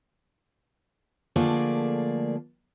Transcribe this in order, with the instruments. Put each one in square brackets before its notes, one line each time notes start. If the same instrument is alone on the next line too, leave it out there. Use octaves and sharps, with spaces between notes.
[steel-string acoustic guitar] D3 F3 A3 A#3 G#4 D5